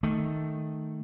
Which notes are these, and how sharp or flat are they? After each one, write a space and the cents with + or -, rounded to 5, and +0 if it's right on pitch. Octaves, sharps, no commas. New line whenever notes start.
D#3 +0 A3 +0